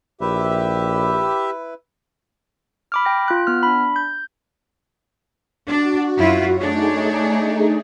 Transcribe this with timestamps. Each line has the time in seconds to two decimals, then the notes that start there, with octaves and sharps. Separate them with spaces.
0.21 A#1 E4 G4 B4 E5
2.92 B5 D6 F6
3.05 G5 A#6
3.28 F4 F#6
3.47 B3 F6
3.63 D4 B5
3.96 G6
5.67 D4 F#4
6.17 F#2 E4 F4
6.57 A3 D4 D#4 G#4 C#5